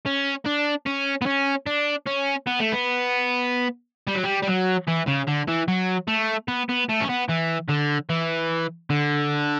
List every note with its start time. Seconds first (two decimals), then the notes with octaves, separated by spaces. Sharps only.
0.06 C#4
0.46 D4
0.86 C#4
1.22 B3
1.26 C#4
1.66 D4
2.06 C#4
2.47 B3
2.59 A3
2.72 B3
4.08 G3
4.16 F#3
4.24 G3
4.43 G3
4.48 F#3
4.88 E3
5.08 C#3
5.28 D3
5.48 E3
5.68 F#3
6.08 A3
6.48 B3
6.69 B3
6.89 A3
7.00 C#4
7.09 B3
7.29 E3
7.69 D3
8.10 E3
8.90 D3